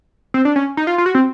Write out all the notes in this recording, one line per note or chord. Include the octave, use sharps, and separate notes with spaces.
C4
D4
C#4
D#4
F4
F4
F#4
C4